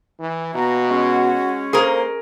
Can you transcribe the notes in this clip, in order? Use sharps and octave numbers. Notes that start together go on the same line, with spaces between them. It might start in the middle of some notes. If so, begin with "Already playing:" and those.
E3
B2 E3 A#3 F#4 A#5
G#3 C#4
A#3 G#4 A#4 C5